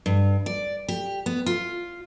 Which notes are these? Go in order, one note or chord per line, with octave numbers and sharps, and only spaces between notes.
G2
D5
G4
B3
F4